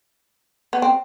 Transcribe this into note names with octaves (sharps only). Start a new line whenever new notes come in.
B3
C4